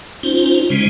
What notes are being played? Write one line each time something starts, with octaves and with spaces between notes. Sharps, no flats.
C#4 D#4 F4 C5
C#3 G3 G#3